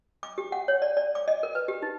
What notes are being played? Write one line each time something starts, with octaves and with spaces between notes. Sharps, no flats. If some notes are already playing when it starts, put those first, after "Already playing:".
D6
G4
F#5
C#5
D5
D5
D6
D#5
A#4
B4
G4
D#4